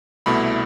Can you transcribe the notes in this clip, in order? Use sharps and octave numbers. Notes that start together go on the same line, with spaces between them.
C2 B2 A3 E4 B5